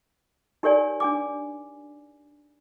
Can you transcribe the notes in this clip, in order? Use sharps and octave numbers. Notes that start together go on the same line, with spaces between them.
D#4 G4 A#4 C#5 D5 G#5
D4 G#5 D6